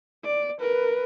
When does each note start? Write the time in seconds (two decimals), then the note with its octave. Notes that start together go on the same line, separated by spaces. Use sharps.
0.24 D5
0.60 A#4 B4